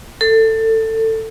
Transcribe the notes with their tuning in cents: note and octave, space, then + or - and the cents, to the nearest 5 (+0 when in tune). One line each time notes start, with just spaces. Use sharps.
A4 +20